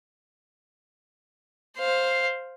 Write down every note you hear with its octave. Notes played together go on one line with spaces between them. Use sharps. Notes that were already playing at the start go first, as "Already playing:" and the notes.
C5 F5